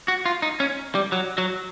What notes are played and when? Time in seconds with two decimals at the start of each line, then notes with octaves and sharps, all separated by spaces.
0.08 F#4
0.26 F4
0.42 D#4
0.60 C#4
0.95 G3
1.12 F#3
1.38 F#3